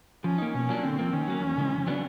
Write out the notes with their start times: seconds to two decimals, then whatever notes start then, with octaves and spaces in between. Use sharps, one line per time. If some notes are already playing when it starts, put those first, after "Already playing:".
0.24 F3 C#4
0.38 A#3 D#4
0.54 B2 C#4
0.69 F#3 A#3 D4 F4
0.84 D3 C4
0.99 F3 A#3
1.13 D#3 C#4
1.28 F#3 A#3
1.43 E2
1.58 C#3 E3 G#3
1.73 F2
1.87 C#3 F#3 B3 D4